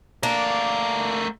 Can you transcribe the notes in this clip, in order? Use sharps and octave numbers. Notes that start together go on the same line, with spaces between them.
A3 A#3 D4 A#4